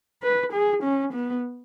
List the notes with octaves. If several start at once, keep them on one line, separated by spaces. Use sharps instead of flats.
B4
G#4
C#4
B3